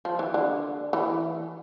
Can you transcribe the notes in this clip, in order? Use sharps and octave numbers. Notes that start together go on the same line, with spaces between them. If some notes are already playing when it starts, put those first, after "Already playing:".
F3
E3
D3
E3